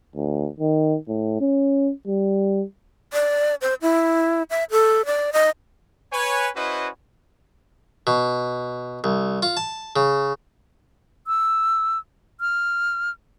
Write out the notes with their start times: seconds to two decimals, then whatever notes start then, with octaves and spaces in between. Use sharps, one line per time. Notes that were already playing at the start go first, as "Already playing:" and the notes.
0.16 D2
0.60 D#3
1.08 A2
1.41 C#4
2.07 G3
3.13 D5
3.61 C5
3.82 E4
4.50 E5
4.71 A4
5.06 D5
5.33 D#5
6.13 B4 C#5 G#5
6.55 C#4 E4 F#4 B4 C5 D#5
8.07 B2
9.04 C2
9.43 F4
9.57 A5
9.96 C#3
11.27 E6
12.40 F6